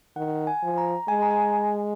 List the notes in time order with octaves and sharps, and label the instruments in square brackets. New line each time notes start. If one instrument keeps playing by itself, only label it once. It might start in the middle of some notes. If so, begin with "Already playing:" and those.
[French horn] D#3 [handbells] F#5
[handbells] G#5
[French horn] F3
[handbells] A#5
[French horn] G#3 [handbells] G#5
[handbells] A#5
G#5